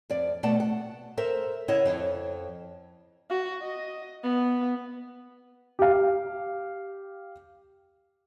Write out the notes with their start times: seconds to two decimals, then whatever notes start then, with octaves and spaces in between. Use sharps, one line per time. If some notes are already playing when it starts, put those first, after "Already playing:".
0.10 F2 D5
0.43 B2 A3 D5 F#5 A5
0.60 F#5
1.17 A4 A#4 C5 E5
1.68 C#3 E4 C#5 D#5 E5 F#5
1.85 F2
3.30 F#4
3.62 D#5
4.23 B3
5.79 G4 F5